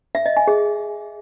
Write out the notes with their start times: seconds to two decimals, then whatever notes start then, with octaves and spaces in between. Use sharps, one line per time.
0.15 E5
0.26 D#5
0.37 G#5
0.47 G#4